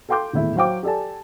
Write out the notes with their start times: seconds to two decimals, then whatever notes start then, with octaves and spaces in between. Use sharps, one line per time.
0.09 A4 F5 G5 C6 D6 G6
0.33 D#1 E2 A2 E4
0.56 F#3 C5 F5 G5 D6
0.83 G4 A4 D5 G#5 A5